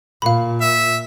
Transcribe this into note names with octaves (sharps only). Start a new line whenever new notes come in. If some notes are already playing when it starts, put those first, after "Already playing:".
A#2 F5 B5
E5